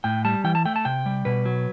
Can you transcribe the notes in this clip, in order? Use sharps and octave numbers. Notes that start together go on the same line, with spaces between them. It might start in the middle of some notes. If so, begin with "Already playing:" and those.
A2 G5
G3 A5
E3 G5
A5
A3 G5
A5
C3 G5
G3
B2 B4
F#3